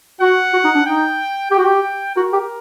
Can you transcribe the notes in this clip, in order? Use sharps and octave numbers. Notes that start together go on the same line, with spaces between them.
F#4 F#5
F#4
D#4
D4
D#4 G5
G4 G5
F#4
G4
F#4 A#4
G4